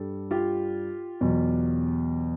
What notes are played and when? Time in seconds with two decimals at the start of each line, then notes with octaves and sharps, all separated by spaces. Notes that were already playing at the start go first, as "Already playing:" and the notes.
Already playing: G2 G3 A4
0.31 F4 G4
1.21 E2 B2 F#3